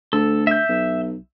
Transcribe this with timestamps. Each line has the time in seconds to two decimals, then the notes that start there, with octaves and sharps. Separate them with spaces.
0.13 D2 A4
0.47 E5 G6
0.69 B1